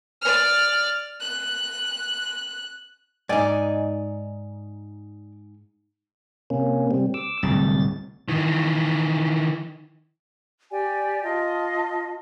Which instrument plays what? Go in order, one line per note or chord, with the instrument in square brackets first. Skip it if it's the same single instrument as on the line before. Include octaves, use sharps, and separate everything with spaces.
[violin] D5 F6
F#6
[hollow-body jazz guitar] G#2 D#4 [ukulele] D5 G#5
[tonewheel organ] C3 A#3 C#4
C3 G3 C4
D6 E6
[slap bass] D1 C2 [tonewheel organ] A6
[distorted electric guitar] D#3 E3
[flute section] G4 D5 G5 G#5
F4 D#5 A5